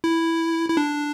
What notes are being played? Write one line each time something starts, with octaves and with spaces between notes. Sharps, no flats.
E4
E4
D4